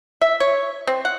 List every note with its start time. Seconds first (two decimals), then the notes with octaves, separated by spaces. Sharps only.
0.21 E5
0.40 C#5
0.87 C4
1.05 F#5